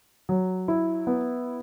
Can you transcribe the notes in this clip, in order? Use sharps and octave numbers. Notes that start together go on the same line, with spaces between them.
F#3
E4
B3